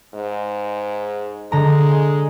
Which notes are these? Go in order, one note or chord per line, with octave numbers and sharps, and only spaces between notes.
G#2
D3 G#3 A#5